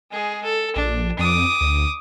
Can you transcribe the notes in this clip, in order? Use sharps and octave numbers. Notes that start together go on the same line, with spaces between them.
G#3 G#4
A4
A#1 D4
F2 D6 D#6
D2